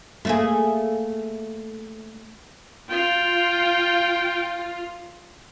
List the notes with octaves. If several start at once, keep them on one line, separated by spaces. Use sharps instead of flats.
A3 A#3 G#4
F4 G5